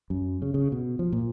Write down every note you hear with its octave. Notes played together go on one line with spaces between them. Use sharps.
F#2
C#3
C#3
B2
F3
A#2